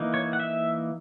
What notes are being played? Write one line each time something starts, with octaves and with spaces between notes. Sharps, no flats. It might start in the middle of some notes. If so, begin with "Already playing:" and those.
Already playing: E3 A#3 D#4
C#5
F#5
E5